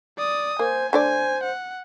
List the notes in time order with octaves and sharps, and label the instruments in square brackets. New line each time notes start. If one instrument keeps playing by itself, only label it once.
[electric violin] D5 D#6
[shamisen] A#3 [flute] C5 [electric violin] G#5
[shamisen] D3 A3 D5 [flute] C5 [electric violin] G#5
[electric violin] F#5